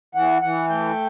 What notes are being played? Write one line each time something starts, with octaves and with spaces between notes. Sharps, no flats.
E3 F#5
E3 F#5
A3 G5